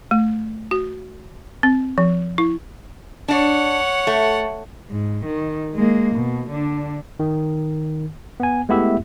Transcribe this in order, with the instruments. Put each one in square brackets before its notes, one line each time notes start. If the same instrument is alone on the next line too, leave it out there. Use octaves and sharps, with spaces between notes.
[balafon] A3
F#4
C4
F3
E4
[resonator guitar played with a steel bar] D4 D5 [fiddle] C#5 F#5
[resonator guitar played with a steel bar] A3
[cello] G#2
D#3
G#3 A#3
B2
D3 D4
[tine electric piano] D#3
B3 G#5
G#3 A3 B3 E4 G4 E5